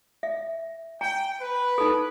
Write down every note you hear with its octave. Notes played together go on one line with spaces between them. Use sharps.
E5
G5 G#5 A#5
B4
D#4 A4